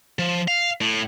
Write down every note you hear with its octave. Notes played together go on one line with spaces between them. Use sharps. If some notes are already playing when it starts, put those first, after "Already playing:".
F3
F5
A2